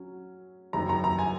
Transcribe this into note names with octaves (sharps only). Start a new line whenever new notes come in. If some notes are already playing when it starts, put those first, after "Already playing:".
Already playing: F#3 C#4
F#1 F#2 D#3 A#5
A#5
A#5
G#5